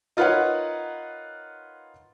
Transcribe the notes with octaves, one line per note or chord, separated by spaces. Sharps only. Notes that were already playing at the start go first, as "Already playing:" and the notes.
D#4 F4 A#4 B4 C#5 F#5